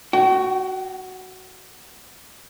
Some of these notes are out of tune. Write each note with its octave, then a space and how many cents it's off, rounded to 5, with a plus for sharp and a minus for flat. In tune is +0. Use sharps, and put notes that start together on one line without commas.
F#4 +5 G5 -40